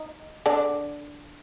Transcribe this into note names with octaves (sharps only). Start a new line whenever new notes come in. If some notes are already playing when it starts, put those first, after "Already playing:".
Already playing: D#4
D3 D4